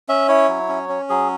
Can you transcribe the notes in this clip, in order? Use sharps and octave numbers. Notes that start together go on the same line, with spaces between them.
C#4 E5
E4 C#5
F#3
C#4
C#4
F#3 G#4